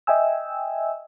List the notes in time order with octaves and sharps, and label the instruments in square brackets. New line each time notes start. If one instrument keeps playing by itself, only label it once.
[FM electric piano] D#5 E5 G5 G#5 E6